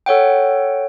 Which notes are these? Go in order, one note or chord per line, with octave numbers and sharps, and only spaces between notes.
A4 C#5 F#5 G5